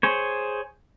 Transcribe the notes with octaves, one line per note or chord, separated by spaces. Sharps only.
G#4 C5 C#5